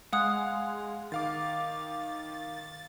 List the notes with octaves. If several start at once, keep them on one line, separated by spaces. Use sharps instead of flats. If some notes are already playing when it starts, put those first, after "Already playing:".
G#3 F5 F#5 D#6 F#6
D#3 F5 D6 A6